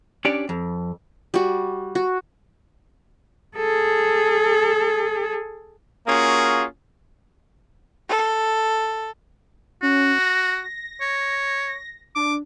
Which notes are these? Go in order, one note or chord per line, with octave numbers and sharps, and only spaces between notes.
C#4 D4 G4 D5
F2
G3 F#4
F#4
G#4 A4
A#3 C#4 F4 F#4 G#4
A4
C#4 F#4
A#6
C#5
D4 D6